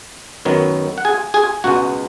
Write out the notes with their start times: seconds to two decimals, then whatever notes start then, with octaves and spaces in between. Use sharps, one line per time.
0.45 F#2 D#3 F#3 B3
0.98 F#5
1.05 G#4 G#5
1.34 G#4 G#5
1.64 C#2 B2 G#3 B3 F#4 F#5